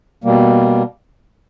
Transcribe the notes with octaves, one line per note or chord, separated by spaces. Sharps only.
B2 G3 A#3